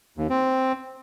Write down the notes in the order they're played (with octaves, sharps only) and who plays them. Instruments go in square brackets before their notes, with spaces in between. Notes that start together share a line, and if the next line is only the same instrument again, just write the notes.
[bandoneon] D#2
C4